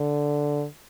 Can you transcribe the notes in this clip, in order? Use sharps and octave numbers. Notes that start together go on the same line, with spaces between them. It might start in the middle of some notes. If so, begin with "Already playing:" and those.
Already playing: D3